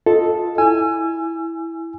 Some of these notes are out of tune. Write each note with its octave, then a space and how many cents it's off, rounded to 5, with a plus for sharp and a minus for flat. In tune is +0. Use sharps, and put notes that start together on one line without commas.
F4 +15 A4 -5 D#5 +5
E4 +0 G#5 +0 E6 +35